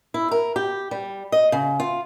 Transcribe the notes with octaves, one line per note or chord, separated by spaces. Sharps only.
E4
A#4
G4
G3
D#5
C#3
F4